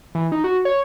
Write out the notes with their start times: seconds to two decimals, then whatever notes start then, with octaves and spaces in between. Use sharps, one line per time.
0.15 E3
0.32 D#4
0.44 F#4
0.65 C#5